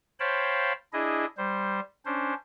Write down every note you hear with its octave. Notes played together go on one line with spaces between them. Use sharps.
C5 C#5 F5 G5 A5 B5
D4 E4 G#4 D#5
G3 C5
C#4 D4 C5